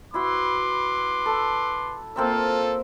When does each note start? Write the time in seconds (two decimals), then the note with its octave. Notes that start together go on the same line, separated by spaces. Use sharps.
0.14 E4 F#4 B4 C6 D6
1.26 A4
2.16 A#3 C4 F4 A4 E5